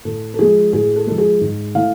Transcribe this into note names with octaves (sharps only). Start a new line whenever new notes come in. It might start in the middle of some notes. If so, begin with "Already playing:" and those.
A2 A4
A4
F3 G#3 G#4
A2 G#4
A4
F3 G#3 A4
G#4
G#2
E3 A3 F5